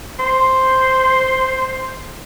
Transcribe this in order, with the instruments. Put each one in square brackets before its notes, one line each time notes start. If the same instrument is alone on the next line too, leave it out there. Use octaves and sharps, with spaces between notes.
[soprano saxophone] C5